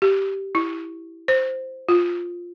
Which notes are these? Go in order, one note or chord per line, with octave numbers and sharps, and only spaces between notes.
G4
E4
C5
F4